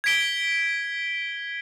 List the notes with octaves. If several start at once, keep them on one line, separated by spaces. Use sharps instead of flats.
G#6 B6 D7 G7